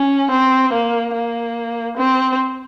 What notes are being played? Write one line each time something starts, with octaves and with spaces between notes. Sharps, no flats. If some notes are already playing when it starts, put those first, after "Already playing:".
Already playing: C#4
C4
A#3
A#3
C4